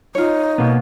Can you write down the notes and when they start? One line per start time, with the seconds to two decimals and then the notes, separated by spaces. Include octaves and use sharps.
0.15 D#4 F4 C#5
0.58 B2 A#3 B3